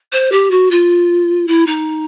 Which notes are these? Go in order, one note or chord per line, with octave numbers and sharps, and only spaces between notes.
C5
G4
F#4
F4
E4
D#4